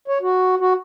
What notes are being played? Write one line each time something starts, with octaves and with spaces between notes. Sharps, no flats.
C#5
F#4
F#4